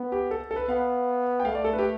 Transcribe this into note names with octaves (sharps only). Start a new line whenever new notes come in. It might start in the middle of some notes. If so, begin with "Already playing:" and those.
Already playing: B3
G4
A4
A4
B4
B3 F5
G5
A3 F5
D5
A4
B4
G4